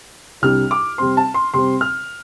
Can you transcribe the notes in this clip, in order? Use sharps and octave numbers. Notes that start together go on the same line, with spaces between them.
C2 C3 G3 D4 F6
D6
C3 G3 C4 C6
A5
C6
C3 G3 C4 C6
F6